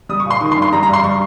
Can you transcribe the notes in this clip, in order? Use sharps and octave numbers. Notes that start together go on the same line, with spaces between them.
G3 D#6
C#6
A#2
C6
D#3 C#6
C6
G2
C6
G3 A#5
A#5
G2 C6
G3 C#6